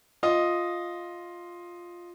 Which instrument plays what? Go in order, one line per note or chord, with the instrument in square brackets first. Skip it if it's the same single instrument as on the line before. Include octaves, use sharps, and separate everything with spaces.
[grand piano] F4 D#5